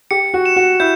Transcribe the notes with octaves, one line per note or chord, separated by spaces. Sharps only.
G4 C#7
F#4
E7
F#4
E4 G6